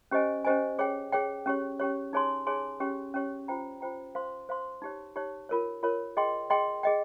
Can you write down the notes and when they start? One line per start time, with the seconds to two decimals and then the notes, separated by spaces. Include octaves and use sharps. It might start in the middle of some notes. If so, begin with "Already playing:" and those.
0.11 C#4 G4 C5 D#5 G#5
0.45 C#4 G4 C5 D#5 G#5
0.79 G#4 C#5 G5
1.12 G#4 C#5 G5
1.46 C#4 G4 C#5
1.79 C#4 G4 C#5
2.13 D#4 G#4 C#5 G#5 C6
2.47 D#4 G#4 C#5 G#5 C6
2.80 C#4 G4 C#5
3.14 C#4 G4 C#5
3.48 F4 C5 G5 A#5
3.81 F4 C5 G5 A#5
4.15 C5 F5 C6
4.49 C5 F5 C6
4.82 D#4 G4 C#5
5.16 D#4 G4 C#5
5.49 F4 A#4 C#5
5.83 F4 A#4 C#5
6.17 G#4 D#5 G5 C6
6.50 G#4 D#5 G5 C6
6.83 G#4 D#5 G5